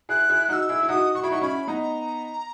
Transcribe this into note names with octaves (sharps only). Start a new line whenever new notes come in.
E4 G#4 F#6
E4 G#4
D#4 F#4 E6 F#6
E4 G#4
E4
D#4 F#4 D#6
F#4 C#6
E4 B5
D#4 F#4 C#6
C#4 E4 B5
B3 D#4 A#5